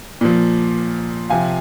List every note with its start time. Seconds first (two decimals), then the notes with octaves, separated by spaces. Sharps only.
0.21 A#2 F3
1.30 C3 F3 F5 G#5